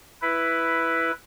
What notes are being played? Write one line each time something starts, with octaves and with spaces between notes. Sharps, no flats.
E4 B4